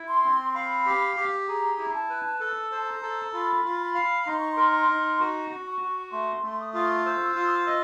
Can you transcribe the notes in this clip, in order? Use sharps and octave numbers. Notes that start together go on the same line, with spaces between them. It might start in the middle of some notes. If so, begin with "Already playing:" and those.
Already playing: E4
C6
C4
F5 B5
G4
G4
G#4 A#5
E4
A5
B4
A4 A5
C5
A#5
A4
F4 B5
F4
B5
F5
D#4 C6
C#6
C6
A#4
C6
D#4
F#4
F#4
C#6
F#4
A3 C6
A3
D#6
F4
C5 E6
F4
D#6
E6
D#5